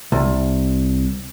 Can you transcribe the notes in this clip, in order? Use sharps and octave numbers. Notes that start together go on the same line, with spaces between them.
C2